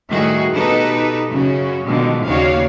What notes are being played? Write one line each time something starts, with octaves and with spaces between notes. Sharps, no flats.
A2 D#3 G3 A3 F#4 G#4
B2 D#4 G4 A4 B4
F#2 C#3 C#4 F#4
B2 D3 D#3 F3 G3 G#3
D#2 C#3 F#4 C#5 D5 F5